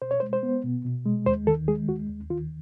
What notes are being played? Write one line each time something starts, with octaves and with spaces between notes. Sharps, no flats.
B2 C5
C#5
G#3 C5
C5
B3
B2
B2
G#3
D#2 C5
D#3 A4
G#3 G#4
D#2 F#4
D#2
D#3 F4